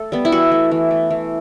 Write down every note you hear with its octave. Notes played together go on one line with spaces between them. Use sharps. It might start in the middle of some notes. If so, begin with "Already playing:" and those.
Already playing: A3 A4
G3 B3
E4
E3 F#4
A3
E3
A3
E3